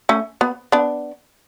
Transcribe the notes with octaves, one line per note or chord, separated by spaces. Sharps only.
A3 C#4
B3
B3 D4